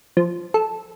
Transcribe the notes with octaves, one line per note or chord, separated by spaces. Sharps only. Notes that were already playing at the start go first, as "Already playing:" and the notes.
F3
A4